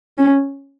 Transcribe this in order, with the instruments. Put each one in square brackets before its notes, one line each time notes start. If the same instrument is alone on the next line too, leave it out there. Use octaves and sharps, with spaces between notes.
[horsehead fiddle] C#4